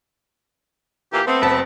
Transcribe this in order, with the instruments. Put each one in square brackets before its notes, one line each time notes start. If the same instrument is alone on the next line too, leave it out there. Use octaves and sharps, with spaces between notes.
[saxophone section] A#2 E3 A#3 [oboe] G4
[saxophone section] A3 B3 C4 [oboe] C5
[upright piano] F#1 A5 [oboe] B5